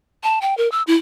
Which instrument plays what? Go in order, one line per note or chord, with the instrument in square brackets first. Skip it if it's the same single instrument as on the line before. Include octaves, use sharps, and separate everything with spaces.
[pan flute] A5
G5
A#4
E6
E4